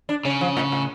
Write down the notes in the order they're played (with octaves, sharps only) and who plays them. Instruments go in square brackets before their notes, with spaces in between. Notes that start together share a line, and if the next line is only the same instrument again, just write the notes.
[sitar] D4
[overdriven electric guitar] C#3 [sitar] C#4
[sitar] F3
A2
A2